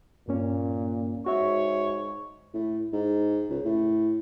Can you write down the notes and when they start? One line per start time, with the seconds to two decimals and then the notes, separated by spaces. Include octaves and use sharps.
0.28 G2 A#2 A#3 C#4
1.26 G#2 F#4 C#5 E5
2.54 A2
2.93 G#2
3.50 C#2
3.65 A2